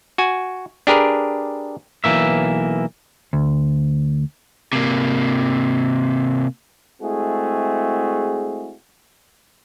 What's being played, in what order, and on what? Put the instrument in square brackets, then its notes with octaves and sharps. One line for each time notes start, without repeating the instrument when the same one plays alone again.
[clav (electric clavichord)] F#4 G#5
D4 G4 G#4 A#4 B4
[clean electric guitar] B1 E3 A#3 E5
D2
[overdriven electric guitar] C3 A#3
[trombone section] G#3 A3 C4 E4 F#4 G#4